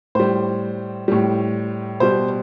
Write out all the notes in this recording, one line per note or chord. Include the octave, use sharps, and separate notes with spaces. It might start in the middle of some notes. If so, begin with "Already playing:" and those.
A2 G3 C5
A2 G3
B2 G3 C5